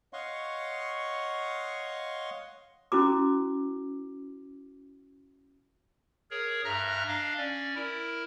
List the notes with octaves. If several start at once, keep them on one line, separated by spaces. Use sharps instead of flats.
C#5 D#5 F5 F#5 C6 C#6
C#4 E4 F#4 D6
G#4 A#4 C#5
G2 E5 A#5 F6 F#6 A#6
D4 D#5 F5
C#4 D5
E4 A#4